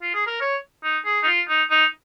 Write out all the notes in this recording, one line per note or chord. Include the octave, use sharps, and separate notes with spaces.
F4
G#4
A#4
C#5
D#4
G#4
D#4
F4
D#4
D#4